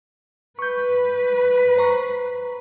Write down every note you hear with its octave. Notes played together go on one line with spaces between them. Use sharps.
B4 C#6 G6
C5 A#5 C#6